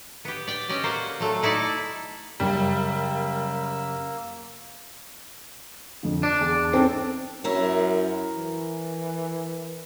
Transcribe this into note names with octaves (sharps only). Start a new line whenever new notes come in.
B3 G4
D5 G5
C#4 G4 D5 D#5
A#3 F#4 C5
F#3 A3
D#4 E4 A4 D5
F#2 C#3 G3 A#3 E6
F2 D3
D4 D5
E2
C4 C#4 D#4 A4
F#2 E4 A#4 C#5
E3